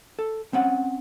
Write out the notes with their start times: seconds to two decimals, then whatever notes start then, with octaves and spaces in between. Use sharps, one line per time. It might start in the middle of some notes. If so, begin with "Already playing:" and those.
0.19 A4
0.53 C4 C#4 F#5